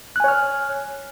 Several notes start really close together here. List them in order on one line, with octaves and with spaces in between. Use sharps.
F#6 G#5 C#5 F6